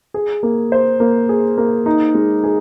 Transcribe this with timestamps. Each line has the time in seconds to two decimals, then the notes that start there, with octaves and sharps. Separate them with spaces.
0.14 G#4
0.43 A#3
0.72 C5
1.00 A#3
1.29 G#4
1.58 A#3
1.86 D#4
2.15 G#3
2.44 G#4